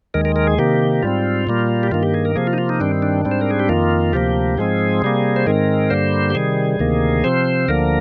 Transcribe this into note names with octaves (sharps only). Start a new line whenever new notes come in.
D#2 D#3 G#3 A#4
A#4
A#4
G#4
C3 D#3 A#3 G4
G#2 G3 C4 F4
A#2 G3 A#3
G4
G2 D#3 A#3 F4
G4
G#4
A#4
C3 F3 A#3 G#4
F4
D#4
F4
D#4
G2 D#3 G3 C4 D4
D4
G#2 G3 C4
C5
A#4
G#4
G4
F2 D#3 A#3 F4
D2 C3 F3 A#3 G4
G#2 F3 G#3 C4 G#4
C3 G3 A#3
C5
G#2 D#3 G#3 C4 A#4
G2 D3 G3 A#3 C5
G4
C3 D#3 G3 G#4
D2 C3 D#3 A#3
C3 F3 C4 C5
D2 D3 F3 A#3 A#4